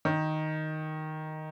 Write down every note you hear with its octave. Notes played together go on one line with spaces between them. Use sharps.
D#3